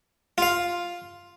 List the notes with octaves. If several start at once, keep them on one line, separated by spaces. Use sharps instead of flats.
F4 F5